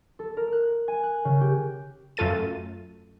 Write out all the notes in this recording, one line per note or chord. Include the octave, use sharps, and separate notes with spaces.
A4
A#4
F#6
G#5
F#6
C#3
G4
F#2 A3 F4 A4 A6 D#7